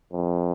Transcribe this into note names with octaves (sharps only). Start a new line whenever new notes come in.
F2